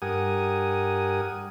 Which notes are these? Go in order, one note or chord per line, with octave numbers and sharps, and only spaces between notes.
G2 G4 A#4 F#5 G#5 D#6